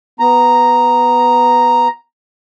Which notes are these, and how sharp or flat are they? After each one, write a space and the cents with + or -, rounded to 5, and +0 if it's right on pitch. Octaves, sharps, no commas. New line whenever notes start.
B3 +5 A#5 +0